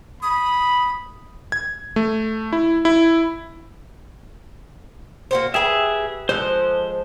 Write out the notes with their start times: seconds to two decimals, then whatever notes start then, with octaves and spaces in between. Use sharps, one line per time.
0.22 B5 D#6
1.52 G#6
1.96 A3
2.52 E4
2.85 E4
5.31 A#3 F#4 C5
5.54 G4 G#4 A#4 B4 E5
6.29 F3 G#3 A4 C5 F#6